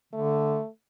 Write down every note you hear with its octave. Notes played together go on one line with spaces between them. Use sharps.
D3 A3